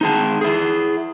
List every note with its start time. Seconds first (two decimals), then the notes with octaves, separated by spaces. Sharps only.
0.01 D#4 G#4 A5
0.41 E4 G#4